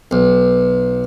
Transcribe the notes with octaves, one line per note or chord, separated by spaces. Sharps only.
B1